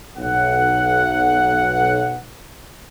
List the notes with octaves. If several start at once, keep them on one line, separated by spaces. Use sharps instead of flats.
B1 F#5